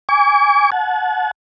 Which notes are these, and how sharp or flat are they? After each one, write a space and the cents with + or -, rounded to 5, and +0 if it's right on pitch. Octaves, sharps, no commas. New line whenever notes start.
G#5 -15 D6 -40
F#5 -15 A5 -40